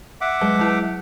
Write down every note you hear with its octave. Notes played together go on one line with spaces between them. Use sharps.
E5 F#5 D6
F#3 G#3
F#3 E4